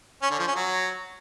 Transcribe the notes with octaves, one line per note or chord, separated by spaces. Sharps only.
C#4
D3
F3
C#4
F#3